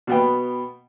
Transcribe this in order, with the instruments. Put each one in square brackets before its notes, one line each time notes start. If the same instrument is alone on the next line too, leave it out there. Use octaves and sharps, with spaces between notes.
[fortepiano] B2 B3 G5